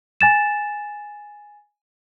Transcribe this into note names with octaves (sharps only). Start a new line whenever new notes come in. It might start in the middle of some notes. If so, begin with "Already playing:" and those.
G#5 A6 E7